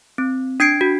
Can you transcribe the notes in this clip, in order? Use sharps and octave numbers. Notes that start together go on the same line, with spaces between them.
C4
D4 G#6 C7 D7
F#4